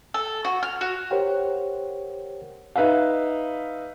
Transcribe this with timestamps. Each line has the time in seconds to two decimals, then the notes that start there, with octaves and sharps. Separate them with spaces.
0.14 A4
0.45 F#4
0.63 F6
0.81 F#4
1.11 G4 A#4 C5 C#5 F#5 G5
2.76 D#4 B4 E5 F5